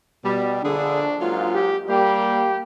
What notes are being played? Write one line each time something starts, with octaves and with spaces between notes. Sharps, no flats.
B2 G3
A#1 D3 D4 G#4
G#2 F#3 A#3 F4
G4
G3 A#3 G4